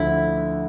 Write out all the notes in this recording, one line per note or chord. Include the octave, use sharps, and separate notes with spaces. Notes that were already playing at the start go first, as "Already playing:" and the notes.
Already playing: D2 D3 F3 E4